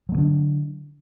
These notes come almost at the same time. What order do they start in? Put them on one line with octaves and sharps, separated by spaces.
F#3 A#3 D3 D4